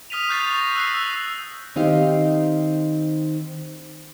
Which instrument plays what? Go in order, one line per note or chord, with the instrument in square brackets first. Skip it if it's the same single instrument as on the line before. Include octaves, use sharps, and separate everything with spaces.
[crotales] D#6 F6 B6 D#7 F7
C#6 F#6 G6 A6 C7 F7
C#6 A#6
E6 F#6 C7
D#6
[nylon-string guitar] D#3 C4 D#4 G4 F5